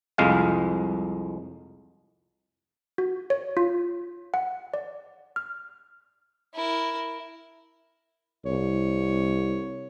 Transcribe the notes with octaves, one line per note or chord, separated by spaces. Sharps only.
C2 F2 G#3 F5
F#4
C#5
F4
F#5
D5
F6
E4 A#4
C2 C#5